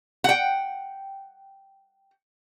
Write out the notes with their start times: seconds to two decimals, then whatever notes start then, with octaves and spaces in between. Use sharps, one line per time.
0.24 F#5 G5